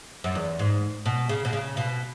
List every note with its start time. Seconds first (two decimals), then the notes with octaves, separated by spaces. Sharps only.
0.24 F#2
0.35 E2
0.59 G#2
1.06 B2
1.29 C#3
1.45 B2
1.53 C#3
1.77 B2